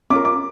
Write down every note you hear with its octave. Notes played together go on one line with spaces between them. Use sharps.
C#4 F4 A#4 D6
D6